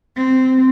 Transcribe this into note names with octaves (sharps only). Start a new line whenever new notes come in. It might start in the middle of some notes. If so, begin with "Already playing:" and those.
C4